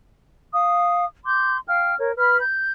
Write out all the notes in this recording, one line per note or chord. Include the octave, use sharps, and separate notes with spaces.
F5 D#6
C6 D6 G6
F5 G5 F6
A#4 C#5
B4 B5 F6
G6